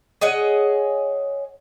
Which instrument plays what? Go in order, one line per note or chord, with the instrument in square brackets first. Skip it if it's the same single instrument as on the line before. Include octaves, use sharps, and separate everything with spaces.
[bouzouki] G#4 C#5 D#5 F#5